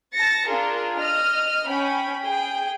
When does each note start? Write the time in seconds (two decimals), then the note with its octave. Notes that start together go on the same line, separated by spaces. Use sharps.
0.14 A5 A6 A#6 C#7
0.48 D4 F4 G#4 A#4
0.98 D#5 F6
1.67 C#4 G5 B5
2.23 G#4 G5